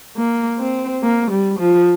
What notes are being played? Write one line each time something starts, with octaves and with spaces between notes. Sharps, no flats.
A#3
C4
A#3
G3
F3